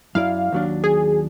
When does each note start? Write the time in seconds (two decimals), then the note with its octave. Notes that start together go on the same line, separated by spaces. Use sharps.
0.15 F#2 E4 D5 F5
0.52 D#2 F#3 D4
0.84 G#4